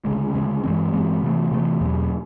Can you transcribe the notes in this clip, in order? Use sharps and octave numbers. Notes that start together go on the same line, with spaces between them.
D2 C#3 E3 G#3
D2 C#3 E3 G#3
G2 E3 G#3 C4
G2 E3 G#3 C4
C3 E3 A3
C3 E3 A3
E2 B2 F#3